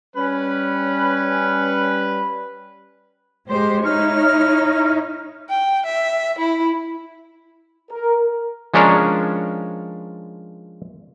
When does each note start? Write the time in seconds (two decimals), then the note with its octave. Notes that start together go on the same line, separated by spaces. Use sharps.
0.16 G3 C#4 B4
3.50 G#3 G4 C5
3.85 D#4 E4 C#5 F6
5.49 G5
5.85 E5
6.38 E4
7.91 A#4
8.74 F3 G#3 C#4 D4 A#4 C#5